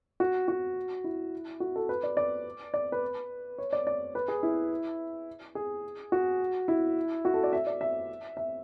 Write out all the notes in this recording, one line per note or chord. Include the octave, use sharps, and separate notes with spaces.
F#4
F#4
E4
F#4
A4
B4
D5
D5
D5
B4
C#5
D5
D5
B4
G#4
E4
G#4
F#4
E4
F#4
A4
D5
E5
D5
E5
E5